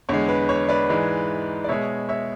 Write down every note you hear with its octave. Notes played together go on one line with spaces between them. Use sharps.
E2 D3 G#3 C#5
B4
C#5
B4 D5
G#2 E3 G#3
D5
B2 G#3 C#5 E5
C#5 E5